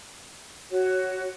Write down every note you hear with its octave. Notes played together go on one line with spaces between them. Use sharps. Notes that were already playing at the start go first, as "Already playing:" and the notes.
F#4 C#5